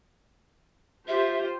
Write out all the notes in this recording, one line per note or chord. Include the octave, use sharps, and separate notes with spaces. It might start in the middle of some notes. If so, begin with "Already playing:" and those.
F4 G4 C5 E5